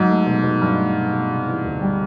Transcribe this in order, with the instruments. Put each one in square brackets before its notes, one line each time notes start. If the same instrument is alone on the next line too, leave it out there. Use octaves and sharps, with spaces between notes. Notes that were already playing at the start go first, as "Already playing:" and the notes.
Already playing: [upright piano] G#2 [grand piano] F#3
[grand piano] A3
B2
B2
[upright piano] G2 [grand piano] F#3
[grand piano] A3
B2
B2
C3
E3
D2
G3